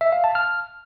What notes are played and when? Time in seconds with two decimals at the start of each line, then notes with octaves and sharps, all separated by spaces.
0.01 E5
0.12 F5
0.24 A5
0.35 F6